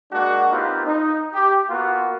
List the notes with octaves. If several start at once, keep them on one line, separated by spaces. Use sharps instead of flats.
G#3 A#3 D4 F#4
A#3 C4 D#4 F4 G4 B4
D#4
G4
A#3 B3 F4 F#4